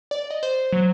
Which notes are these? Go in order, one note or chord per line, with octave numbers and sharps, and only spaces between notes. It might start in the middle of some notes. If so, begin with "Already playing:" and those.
D5
D#5
C5
F#3